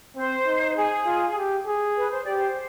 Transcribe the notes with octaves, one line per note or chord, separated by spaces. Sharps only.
C4 C5
D#4
G#4
F4
G4
G#4
B4
C5
G4 D5
C5